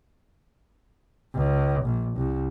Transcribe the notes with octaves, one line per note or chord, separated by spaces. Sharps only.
C#2
A#1
C2